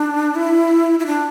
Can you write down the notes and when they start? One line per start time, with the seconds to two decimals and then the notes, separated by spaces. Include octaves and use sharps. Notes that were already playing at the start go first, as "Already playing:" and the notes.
Already playing: D4
0.35 E4
0.99 E4
1.07 D4